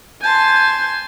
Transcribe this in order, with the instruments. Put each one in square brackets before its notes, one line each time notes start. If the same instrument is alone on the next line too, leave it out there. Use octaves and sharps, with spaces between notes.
[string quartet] G#5 A5 C6 [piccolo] G6